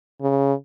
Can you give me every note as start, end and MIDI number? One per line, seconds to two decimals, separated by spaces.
0.21 0.53 49